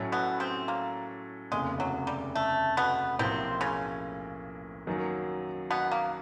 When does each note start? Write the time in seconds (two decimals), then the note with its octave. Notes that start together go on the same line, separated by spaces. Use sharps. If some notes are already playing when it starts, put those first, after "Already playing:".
Already playing: A2 F#3 A3 C#4
0.12 B2 B3
0.40 C3 C4
0.68 A#3
1.52 F1 D#2 C#3 G#3
1.80 F#3
2.07 G3
2.35 A3
2.77 B2 B3
3.19 B1 A2 C3 F3 A#3 C4
3.61 C#3 C#4
4.87 F#2 D#3 F#3 A#3
5.70 B2 B3
5.91 A#3